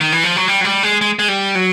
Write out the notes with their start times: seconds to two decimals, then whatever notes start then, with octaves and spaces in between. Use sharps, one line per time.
0.01 D#3
0.12 E3
0.24 F3
0.36 F#3
0.48 G3
0.61 F#3
0.65 G3
0.83 G#3
1.01 G#3
1.19 G#3
1.28 G3
1.55 F#3